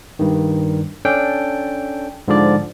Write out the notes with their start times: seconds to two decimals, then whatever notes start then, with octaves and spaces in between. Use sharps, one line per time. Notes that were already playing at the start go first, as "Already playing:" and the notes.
0.19 G2 D#3
1.05 C#4 D4 A4 G5
2.28 G#2 D3 F3 D5